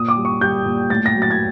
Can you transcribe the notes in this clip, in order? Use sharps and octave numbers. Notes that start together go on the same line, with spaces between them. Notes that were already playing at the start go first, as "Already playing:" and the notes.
Already playing: A#2 D#6
D6
G3
C#6
G3 G6
A#2
A2 A6
A#6
F#3
A6
G#6